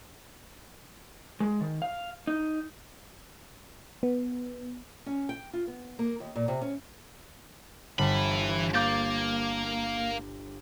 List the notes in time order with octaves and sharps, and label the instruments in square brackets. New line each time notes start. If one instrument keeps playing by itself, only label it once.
[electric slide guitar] G#3
D#3
F5
D#4
[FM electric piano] B3
[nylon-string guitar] C#4
G5
F4
B3
A#3
D#2
A#2
C3
C#4
[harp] G1 [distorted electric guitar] E3 B5
[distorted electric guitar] A#3 [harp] D6 G6 A6